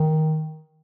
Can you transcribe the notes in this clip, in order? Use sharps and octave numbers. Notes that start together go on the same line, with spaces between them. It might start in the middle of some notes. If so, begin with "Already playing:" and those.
Already playing: D#3